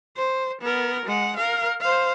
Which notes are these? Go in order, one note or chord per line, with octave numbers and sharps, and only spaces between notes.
C5
B3 A#4
G#3 F#5
A#4 F5
C5 F5